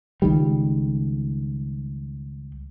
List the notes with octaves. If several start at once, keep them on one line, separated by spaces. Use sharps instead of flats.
C#2 D#3 G3